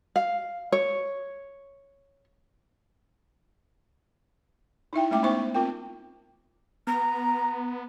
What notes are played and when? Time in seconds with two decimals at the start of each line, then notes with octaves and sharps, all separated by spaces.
0.16 F5
0.72 C#5
4.93 D#4 E4 E5 G5
5.11 G#3 A3 C#4 E5 G5 D6
5.23 B3 D#4 C5 E5 C#6
5.55 C4 F4 A#4 G5
6.87 B3 A#5